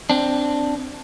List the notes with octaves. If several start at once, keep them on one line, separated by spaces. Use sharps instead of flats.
C4 D4